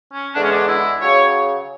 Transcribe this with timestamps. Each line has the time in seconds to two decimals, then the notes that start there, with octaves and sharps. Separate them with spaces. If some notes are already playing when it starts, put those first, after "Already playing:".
0.13 C#4
0.34 E2 D3 G#3 D4
0.44 C#4
0.52 D4
0.69 E4
1.01 C#3 F#3 C#5